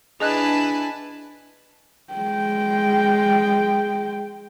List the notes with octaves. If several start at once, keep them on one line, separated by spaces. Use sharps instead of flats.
D4 E4 G#4 B4 D#5 G#5 A5 F#6
G#3 G5